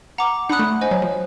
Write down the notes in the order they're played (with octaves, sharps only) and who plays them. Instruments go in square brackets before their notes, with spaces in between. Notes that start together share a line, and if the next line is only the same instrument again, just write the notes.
[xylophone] F#5 A#5 D6
[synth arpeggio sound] D4 [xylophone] F#5 B5 D#6 F#6
[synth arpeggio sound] A3
[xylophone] C5 D#5 G#5
[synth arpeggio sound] F#3
F3